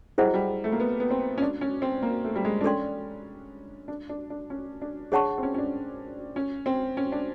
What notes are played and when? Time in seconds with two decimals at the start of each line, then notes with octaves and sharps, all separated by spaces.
0.18 G3 E4 G#4 C5 D#5 F#5
0.26 F#3
0.34 G3
0.64 A3
0.72 A#3
0.80 B3
1.00 B3
1.11 C4
1.38 C#4
1.42 D4
1.61 C#4
1.82 C4
2.02 A#3
2.24 A3
2.36 G3
2.45 G#3
2.61 D4
2.64 C#4 A4 D5 G5 C6
3.88 D4
4.09 D4
4.30 D4
4.50 C#4
4.82 D4
5.12 D4 G#4 C#5 F#5 A5 C#6
5.38 C4
5.43 C#4
5.54 C#4
5.58 D4
6.36 C#4
6.66 C4
6.97 C#4
7.12 D4